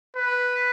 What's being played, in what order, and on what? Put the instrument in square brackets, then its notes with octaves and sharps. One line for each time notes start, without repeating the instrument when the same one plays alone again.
[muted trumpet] B4